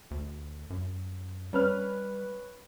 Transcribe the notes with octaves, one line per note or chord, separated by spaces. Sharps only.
D2
F#2
G3 C#4 B4 F6